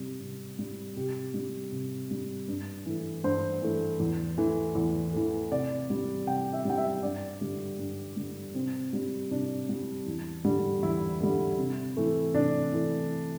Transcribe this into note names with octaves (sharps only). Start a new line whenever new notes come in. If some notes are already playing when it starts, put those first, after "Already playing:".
Already playing: C3 G3
C3
G3
C3 G4
G3
C3
G3
G2
E3 A3
G2 C5
E3 A3
E2
E3 A3
E2
E3 A3
C3 D5
G3
C3 G5
E5
G3 G5
E5
G2 D5
D3 G3
G2
D3 G3
C3 C4
G3
C3 D4
G3
E2
D3 G3
E2 E4
D3 G3
C3
E3 A3
C3 D4
E3 A3